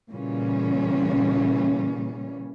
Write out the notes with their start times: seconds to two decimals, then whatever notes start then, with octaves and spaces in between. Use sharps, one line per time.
0.11 A#2 C#3 E3 G3 C#4